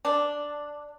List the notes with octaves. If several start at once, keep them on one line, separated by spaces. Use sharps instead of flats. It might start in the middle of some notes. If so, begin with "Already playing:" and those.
D4